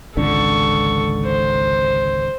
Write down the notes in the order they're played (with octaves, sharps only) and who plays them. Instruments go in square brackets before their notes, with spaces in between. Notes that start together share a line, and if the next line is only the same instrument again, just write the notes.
[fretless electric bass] G#1 C#2 D3 [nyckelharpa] A4 C#6
[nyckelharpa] C5